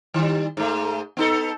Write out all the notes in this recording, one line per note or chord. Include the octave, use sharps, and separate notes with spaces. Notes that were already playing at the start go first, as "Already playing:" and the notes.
D#3 G3
G#2 A3
B3 D#4 A4